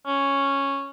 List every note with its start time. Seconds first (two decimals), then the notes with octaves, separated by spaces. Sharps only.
0.07 C#4